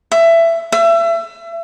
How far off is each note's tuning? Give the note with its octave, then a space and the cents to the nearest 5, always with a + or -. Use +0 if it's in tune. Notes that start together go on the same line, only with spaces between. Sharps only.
E5 +15
E5 +30